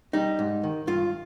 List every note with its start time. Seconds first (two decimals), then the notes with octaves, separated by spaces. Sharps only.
0.13 G3 D#4
0.39 G#2
0.64 D#3
0.87 G2 F4